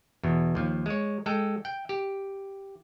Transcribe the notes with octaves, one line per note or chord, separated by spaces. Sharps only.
E2 B2
D#2 F3
G#3 C#5
G#3 A4 G5
G5
G4